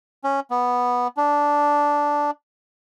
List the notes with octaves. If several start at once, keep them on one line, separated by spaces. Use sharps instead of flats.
C#4
B3
D4